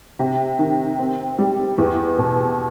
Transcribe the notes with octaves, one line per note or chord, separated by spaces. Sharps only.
C3
D#3
C4
G3
E2
B2